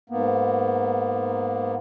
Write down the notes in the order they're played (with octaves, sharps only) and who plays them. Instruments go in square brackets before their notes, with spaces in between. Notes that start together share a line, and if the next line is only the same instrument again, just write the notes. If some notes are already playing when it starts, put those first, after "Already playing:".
[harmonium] G#2 A#3 B3